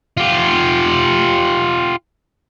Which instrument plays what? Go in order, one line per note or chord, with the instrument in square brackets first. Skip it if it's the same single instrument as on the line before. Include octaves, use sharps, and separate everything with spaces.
[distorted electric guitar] F4 G4